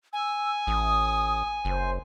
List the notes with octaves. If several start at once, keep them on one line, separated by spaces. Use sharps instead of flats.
G#5 E6
A1 D#6
F#1 C5